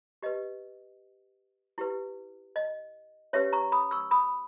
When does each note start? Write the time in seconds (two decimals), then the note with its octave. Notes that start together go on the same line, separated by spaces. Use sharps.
0.23 G4 B4 D#5
1.78 E4 G4 B4
2.56 D#5
3.33 C#4 G4 B4 C#5 E5
3.53 A#5 C#6
3.72 B5 D#6
3.91 C#6 E6
4.11 B5 D#6